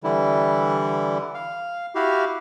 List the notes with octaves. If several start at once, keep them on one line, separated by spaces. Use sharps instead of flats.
D3 E3 G3 E4
F5
E4 F#4 G4 F5